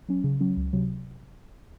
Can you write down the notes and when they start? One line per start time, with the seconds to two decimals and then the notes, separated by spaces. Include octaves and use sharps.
0.09 F#3 C#4
0.24 C#3
0.40 F#3 C#4
0.57 C#2
0.73 C3 F#3